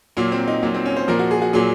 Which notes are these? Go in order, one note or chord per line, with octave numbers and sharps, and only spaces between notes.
A#2 F#3 A#3
C4
D#4
A#2 F#3 D#4
C4
C#4
C5
A#2 F3 A#4
F#4
G#4
F#4
A#2 F#3 G#4